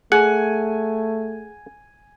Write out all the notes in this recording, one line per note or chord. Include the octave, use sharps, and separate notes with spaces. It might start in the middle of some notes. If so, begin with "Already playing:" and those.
A3 G#4 F#5 G#5